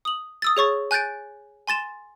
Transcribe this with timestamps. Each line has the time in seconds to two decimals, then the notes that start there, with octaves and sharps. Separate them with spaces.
0.05 D#6 F#7
0.42 D#6 E6 A6
0.57 G#4 C#5 C#6 A6
0.91 G#5 F#6 G6 A6 D7
1.67 G#5 C6 A6 E7